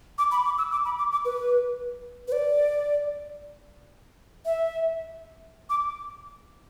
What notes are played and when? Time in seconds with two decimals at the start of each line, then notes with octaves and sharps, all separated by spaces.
0.18 D6
0.31 B5
0.45 D6
0.58 E6
0.72 D6
0.85 B5
0.98 D6
1.12 D6
1.25 B4
2.28 B4
2.32 D5
4.45 E5
5.70 D6